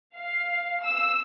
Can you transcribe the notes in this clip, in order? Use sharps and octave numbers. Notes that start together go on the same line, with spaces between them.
F5
E6